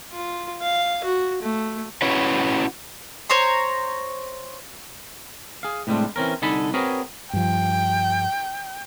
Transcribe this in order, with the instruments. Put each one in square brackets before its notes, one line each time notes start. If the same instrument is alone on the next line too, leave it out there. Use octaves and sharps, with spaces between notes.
[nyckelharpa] F4
F5
F#4
A3
[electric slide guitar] C#4 E4 F#4 B4 C#5
[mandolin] C5 C#5 A#5 C6
[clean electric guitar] G#4 F5
A2 C3 G3 G#3 C4 D4
E3 C4 C#4 A#4
C2 D3 D#4 A4 G#5 B5
C4 F#4 G#4 A#4 B4 C#5
[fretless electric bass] G2 F3 [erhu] G5